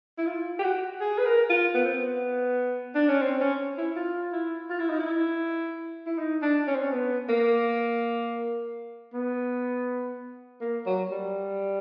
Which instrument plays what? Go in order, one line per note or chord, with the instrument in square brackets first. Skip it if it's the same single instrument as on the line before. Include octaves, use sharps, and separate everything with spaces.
[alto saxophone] E4
F4
G4
F#4
G#4
B4
A#4
F4
B3
C4
B3
D4
C#4
C4
C#4
E4
F4
E4
F4
E4
D#4
E4
E4
D#4
D4
C#4
C4
C#4
B3
A#3
B3
A#3
F#3
G3